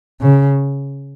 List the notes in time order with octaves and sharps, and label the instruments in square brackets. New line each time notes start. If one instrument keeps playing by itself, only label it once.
[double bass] C#3